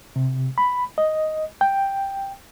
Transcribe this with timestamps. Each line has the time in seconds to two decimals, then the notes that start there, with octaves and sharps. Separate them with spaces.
0.16 C3
0.58 B5
0.98 D#5
1.61 G5